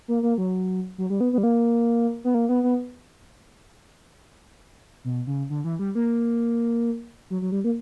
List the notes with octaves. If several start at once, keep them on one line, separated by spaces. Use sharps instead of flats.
A#3
A#3
F#3
F#3
G3
B3
B3
G3
A#3
B3
A#3
B3
B3
B2
C#3
D3
E3
G3
A#3
F#3
F#3
G3
A#3